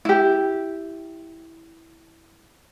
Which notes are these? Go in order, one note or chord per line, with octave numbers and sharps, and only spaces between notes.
E4 G4